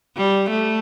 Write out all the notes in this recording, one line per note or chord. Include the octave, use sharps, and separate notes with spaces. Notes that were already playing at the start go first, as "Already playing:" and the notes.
G3
A3